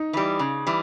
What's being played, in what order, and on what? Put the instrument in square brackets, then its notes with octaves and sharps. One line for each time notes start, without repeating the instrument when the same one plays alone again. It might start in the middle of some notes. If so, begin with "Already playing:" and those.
Already playing: [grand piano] D#4
[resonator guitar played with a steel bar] E3 G3
C#3
E3 G3